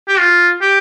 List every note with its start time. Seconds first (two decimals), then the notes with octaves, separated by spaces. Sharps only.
0.08 G4
0.19 F4
0.61 G4